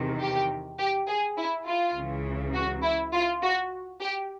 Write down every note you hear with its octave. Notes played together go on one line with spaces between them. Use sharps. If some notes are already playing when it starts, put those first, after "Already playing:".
Already playing: E2 C3 D#3
G4
G4
G#4
E4
F4
C#2 C#3 E3
F#4
E4
F4
F#4
G4